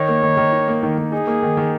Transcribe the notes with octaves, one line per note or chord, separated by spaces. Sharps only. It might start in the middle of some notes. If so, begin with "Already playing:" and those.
Already playing: D#3 D#4 C#5
A#3
D#3
D#3
D#4
A#3
D#3
D#3
D#4 G#4
A#3
D#3
D#3